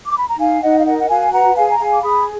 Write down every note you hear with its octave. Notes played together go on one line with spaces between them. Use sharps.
D6
B5
A#5
D#4 F5 G#5
D#4 D#5 F#5
F5
A#4 D#5 F#5
F#5
F#4 F5 G#5
B4 F#5 A#5
G#4 F5 G#5
A#5
G#4 F5 G#5
D6
G#4 B5 D#6